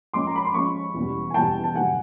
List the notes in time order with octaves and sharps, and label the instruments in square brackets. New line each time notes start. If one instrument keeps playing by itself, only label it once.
[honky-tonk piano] F3 G#3 C#4 [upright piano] C6 D6
[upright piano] A#5
B5
C6
[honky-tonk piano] F3 G#3 C#4 [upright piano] B5 C#6
[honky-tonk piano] E2 B2 G3
[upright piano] G#5
[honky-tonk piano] E2 B2 G3 [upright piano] G5 A5
[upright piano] A5
[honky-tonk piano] G2 D3 F#3 [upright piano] F#5 G#5